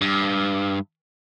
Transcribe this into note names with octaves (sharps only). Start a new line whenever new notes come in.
G2